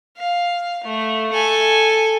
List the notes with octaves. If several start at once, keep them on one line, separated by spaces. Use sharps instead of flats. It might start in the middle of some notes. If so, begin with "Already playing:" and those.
F5
A3
A4 G#5